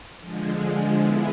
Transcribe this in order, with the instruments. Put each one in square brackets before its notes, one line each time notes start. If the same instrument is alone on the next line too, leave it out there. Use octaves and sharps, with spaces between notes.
[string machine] D3 F3 G#3
G#3 B3 E4